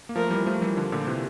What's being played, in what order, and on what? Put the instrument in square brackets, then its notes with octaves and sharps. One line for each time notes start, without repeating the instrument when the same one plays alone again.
[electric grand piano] A#3
[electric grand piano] F3 A3 [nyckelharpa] A#4
[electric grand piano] E3 G3
F3 A3
E3 G3
D3 F3
A#2 D3
C3 E3